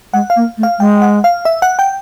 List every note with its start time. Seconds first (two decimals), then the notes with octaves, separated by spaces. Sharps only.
0.13 G#3 F#5
0.30 F5
0.36 A#3
0.58 A3
0.63 F5
0.79 G#3 G5
1.02 F#5
1.24 F5
1.45 E5
1.62 F#5
1.79 G5